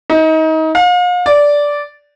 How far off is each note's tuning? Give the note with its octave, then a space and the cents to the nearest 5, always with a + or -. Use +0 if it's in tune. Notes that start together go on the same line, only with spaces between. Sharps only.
D#4 +30
F5 +40
D5 -10